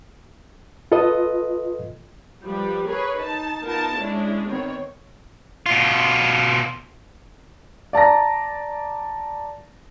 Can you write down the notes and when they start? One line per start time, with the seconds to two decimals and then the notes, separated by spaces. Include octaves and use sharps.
0.92 F4 A4 B4 D#5
2.42 F3 G3 G4 B4
2.86 G#4 A#4 B4 C#5
3.19 D#4 A5
3.63 B3 D#4 F4 A#4 A5
3.97 G#3 C#4 D4 E4
4.47 D#3 B3 C4 C#5
5.66 B2 F4
7.93 D5 A5 A#5 A#6